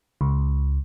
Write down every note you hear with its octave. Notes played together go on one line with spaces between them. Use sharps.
C#2